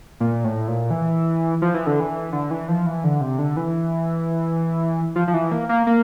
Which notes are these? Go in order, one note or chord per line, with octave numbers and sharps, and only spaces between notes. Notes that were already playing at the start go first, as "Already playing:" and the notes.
A#2
A2
A#2
E3
F3
E3
D3
E3
D3
E3
F3
E3
D3
C3
D3
E3
F3
F3
E3
A#3
A#3
A#3